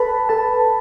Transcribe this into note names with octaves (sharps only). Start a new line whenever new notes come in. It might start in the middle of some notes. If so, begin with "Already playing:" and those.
Already playing: A4 B4 A5 B5
A4 A5